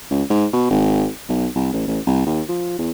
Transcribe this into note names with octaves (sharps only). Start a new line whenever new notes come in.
C#2
G#2
B2
G#1
B1
C2
A1
A1
C2
D#2
F3
E2